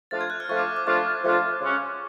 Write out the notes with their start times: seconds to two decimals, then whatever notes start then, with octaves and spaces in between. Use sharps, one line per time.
0.11 F3 A3 D4 F4 A6
0.21 G#6
0.30 F#6
0.40 F6
0.49 F3 A3 D4 F4 C#6
0.59 D6
0.77 D6
0.86 F3 A3 D4 F4 C#6
1.24 F3 A3 D4 F4
1.61 C#3 G#3 C#4 F#4